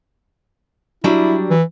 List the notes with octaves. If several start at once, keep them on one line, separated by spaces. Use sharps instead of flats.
F#3 G3 D4 E4
E3